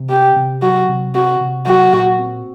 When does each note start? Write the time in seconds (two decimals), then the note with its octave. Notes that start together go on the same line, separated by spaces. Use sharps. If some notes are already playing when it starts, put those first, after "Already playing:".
Already playing: C3
0.10 C4 G4
0.36 C3
0.62 F#3 F#4
0.89 C3
1.15 C4 F#4
1.41 C3
1.67 F#3 F#4
1.93 A#2
2.19 C4